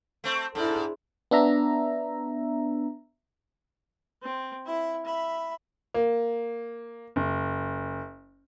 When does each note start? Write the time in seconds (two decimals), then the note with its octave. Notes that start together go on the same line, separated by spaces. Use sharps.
0.24 A3 C4
0.55 G#2 D4 E4 A4
1.31 B3 D4 E5 A#5
4.22 C4
4.66 E4 E5
5.05 E5 B5
5.94 A#3
7.16 F#1